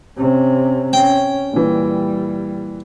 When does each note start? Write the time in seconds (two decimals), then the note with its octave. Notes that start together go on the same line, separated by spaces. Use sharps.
0.17 C3 C#4
0.93 C#4 G5
1.53 A#2 E3 G3